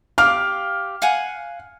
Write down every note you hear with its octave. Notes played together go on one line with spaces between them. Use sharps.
G4 F5 D6 F6
F5 F#5 G#5